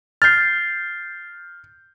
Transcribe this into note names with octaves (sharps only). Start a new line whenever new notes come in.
F6 G6 A6 C7